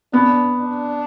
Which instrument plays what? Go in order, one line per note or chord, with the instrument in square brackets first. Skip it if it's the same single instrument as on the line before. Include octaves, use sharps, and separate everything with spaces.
[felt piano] B3 [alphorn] D4
[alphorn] D4